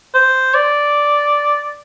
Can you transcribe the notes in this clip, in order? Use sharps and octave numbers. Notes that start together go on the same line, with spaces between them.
C5
D5